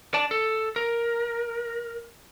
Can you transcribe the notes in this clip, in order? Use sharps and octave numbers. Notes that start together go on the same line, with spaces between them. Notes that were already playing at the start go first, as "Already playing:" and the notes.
D5 A5
A4
A#4